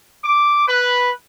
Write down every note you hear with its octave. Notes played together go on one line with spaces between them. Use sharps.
D6
B4